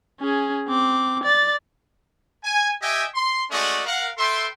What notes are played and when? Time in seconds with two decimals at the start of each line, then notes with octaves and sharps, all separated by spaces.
0.20 C#4 G#4
0.67 C4 D6
1.24 D5 A6
2.44 G#5
2.81 G4 D#5 E5 G5 G#5
3.14 C6
3.50 G#3 A3 C#4 F#4 D5 D#5
3.86 A#4 F5 F#5
4.18 A4 B4 E5 G5 C6